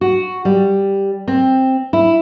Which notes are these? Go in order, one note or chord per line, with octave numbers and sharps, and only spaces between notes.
F#4
G3
C4
E4